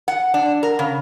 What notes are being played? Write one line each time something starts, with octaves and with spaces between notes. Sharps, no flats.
F#5
D4
A#4
C#3